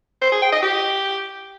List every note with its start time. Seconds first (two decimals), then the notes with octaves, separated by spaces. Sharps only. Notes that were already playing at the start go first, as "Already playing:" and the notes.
0.22 C5
0.32 G#4
0.42 G5
0.52 D#5
0.62 G4